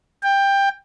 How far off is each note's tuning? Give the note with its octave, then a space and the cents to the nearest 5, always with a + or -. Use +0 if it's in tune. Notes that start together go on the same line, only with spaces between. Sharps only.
G5 +15